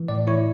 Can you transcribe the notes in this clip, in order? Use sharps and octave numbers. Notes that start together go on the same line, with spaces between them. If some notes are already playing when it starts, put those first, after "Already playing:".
Already playing: E3
A2 D5
E4 C#5